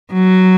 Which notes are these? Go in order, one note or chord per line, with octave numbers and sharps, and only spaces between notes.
F#3